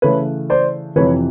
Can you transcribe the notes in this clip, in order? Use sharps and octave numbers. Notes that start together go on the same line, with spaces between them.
C#3 E3 A3 B4 C#5
C5 D5
F2 C3 E3 B4 C#5